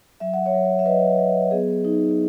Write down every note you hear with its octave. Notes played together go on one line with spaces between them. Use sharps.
F#3 E5
F#5
C#5 E5
F#3
E5
F#3 B4 D#5
F#3
B3 G#4
D#4